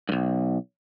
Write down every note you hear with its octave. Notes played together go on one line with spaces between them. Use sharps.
B1 G2